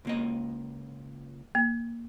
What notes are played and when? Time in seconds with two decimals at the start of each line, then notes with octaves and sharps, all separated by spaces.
0.05 C#2 A#3 D#5
1.55 A#3